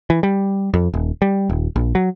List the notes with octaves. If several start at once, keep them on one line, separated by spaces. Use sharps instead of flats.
E3
G3
F2
D#1
G3
D#1
A#1
F#3